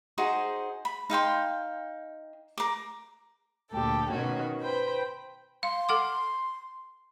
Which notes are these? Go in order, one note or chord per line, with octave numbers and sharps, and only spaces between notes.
D#4 F#4 G#4 C5
B5
D#4 F5 G5 C6
A#4 D6
D2 A#2 G4 A4 G5
B2 D#3 C#4 F#4 C#5
B4 C5 G5 B5
F5 C6
A4 F#5 D6